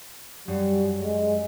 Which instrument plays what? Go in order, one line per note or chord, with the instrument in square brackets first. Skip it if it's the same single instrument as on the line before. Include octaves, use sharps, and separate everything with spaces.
[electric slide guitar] F#2 [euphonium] G3
[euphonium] G#3